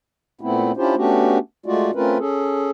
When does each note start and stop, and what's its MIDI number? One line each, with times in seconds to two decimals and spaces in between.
0.41 0.72 46
0.41 0.72 57
0.41 0.72 59
0.41 0.72 60
0.41 0.72 64
0.77 0.95 61
0.77 0.95 62
0.77 0.95 64
0.77 0.95 65
0.77 0.95 67
0.77 0.95 72
0.96 1.38 57
0.96 1.38 59
0.96 1.38 61
0.96 1.38 62
0.96 1.38 66
0.96 1.38 67
1.66 1.91 56
1.66 1.91 57
1.66 1.91 65
1.66 1.91 66
1.66 1.91 74
1.95 2.18 57
1.95 2.18 60
1.95 2.18 61
1.95 2.18 65
1.95 2.18 70
1.95 2.18 71
2.19 2.71 61
2.19 2.71 68
2.19 2.71 69